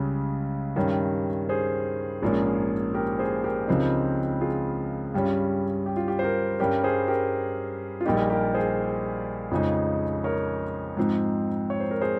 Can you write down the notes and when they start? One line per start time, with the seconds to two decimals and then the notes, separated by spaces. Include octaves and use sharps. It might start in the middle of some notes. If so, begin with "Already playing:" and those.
Already playing: C#2 C#3 G3 C#4
0.76 G2 D#3 G3 C#4
1.49 G#4 C5
2.22 A#1 G#2 F3 A#3 C#4
2.94 G4 A#4
3.19 G#4 C5
3.44 G4 A#4
3.68 C#2 C#3 F3 C4 D#4
4.41 F4 G#4
5.14 G2 G3 C#4
5.86 G4
5.97 F4
6.08 G4
6.19 C5
6.23 G4 A#4
6.60 G2 G3 C#4 G4 A#4
6.84 G#4 C5
7.08 G4 A#4
8.01 F4
8.05 A#1 A#2 G3 A#3 D#4 G4
8.30 G4 A#4
8.54 G#4 C5
9.51 F2 C#3 F3 G#3 D#4
10.24 A#4 C#5
10.97 G#2 F3 C4 D#4
11.70 C#5
11.80 C5
11.91 A#4
12.01 G#4 C5